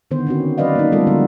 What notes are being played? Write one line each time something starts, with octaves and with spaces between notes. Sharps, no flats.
D3 D#3 B3 C5
C4 C#4 F#4
F#3 C#4 B4 D5 D#5 F5
A#3 D#4
G3 G#3 B3 F4 A4
D3 F3 G#3 B3 D4 F#4